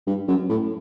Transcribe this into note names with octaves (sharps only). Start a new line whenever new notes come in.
G2
F#2
A2